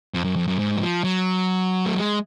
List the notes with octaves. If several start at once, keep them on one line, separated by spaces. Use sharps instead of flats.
F2
F#2
F2
F#2
G#2
F#3
F3
F#3
A3
G#3